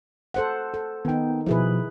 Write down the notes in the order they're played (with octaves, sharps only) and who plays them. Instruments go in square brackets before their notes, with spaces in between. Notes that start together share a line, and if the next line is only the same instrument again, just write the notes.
[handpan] A4 C5 F#5
A4
[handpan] D#3 D#4 [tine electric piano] B3 G5
[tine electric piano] B2 F3 [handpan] E4 G#4 B4